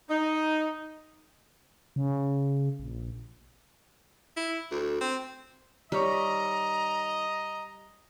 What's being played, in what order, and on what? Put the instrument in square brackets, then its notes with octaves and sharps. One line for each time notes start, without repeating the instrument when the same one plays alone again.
[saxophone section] D#4
[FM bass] C#3
A#1
[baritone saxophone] E4
D2
C4
[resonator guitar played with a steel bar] D#3 C#5 [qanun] G3 G4 B5 [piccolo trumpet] D#5 [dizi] A#5